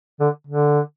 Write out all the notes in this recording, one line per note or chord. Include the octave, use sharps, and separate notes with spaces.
D3
D3